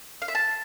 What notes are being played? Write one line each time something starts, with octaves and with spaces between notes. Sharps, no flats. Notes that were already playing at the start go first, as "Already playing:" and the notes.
F5
E5
A5